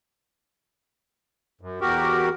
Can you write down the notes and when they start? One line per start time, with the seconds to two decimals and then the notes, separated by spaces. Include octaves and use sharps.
1.61 F#2
1.81 E2 F#4 G4 A#4